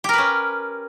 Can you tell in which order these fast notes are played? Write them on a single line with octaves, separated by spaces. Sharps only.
G4 A#4 B4 C#4